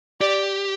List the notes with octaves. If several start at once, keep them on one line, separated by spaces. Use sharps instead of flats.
G4 D5